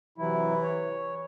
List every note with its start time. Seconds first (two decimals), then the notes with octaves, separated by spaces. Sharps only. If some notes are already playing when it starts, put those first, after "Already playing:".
0.18 C3 E3 F#3 E4
0.62 C#5